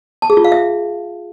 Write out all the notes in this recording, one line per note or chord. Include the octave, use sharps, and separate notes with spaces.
A5
G#4
F4
F5
E5